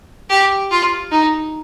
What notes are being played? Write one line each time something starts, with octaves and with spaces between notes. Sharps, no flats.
G4
F4
D#4